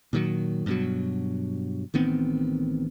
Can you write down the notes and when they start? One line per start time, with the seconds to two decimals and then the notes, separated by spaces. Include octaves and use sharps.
0.13 A#2 D#3 F#3
0.66 G2 B2 F#3
1.94 A1 D#3 B3 C4